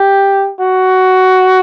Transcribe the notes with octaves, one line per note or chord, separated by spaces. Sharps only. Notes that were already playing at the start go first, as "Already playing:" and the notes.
Already playing: G4
F#4